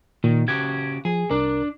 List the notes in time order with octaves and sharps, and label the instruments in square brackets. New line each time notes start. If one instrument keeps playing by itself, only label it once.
[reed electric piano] A#2 [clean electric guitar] D#3
[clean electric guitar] C#3 F#4 G4 [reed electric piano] G#6
[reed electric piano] F3 [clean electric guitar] G#4
[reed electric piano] C2 A#4 [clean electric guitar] D4